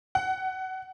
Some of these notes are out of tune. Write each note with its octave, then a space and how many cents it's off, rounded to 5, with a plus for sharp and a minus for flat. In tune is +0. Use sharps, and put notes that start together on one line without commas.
F#5 +25